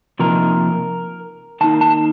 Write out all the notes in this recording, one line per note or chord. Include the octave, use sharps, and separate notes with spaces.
C3 F3 A#3 D#4 A#4
D#3 A#3 D#4 A5
A5